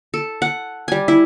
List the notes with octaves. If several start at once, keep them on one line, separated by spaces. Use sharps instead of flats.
A4
F#5
G3 G#5
E4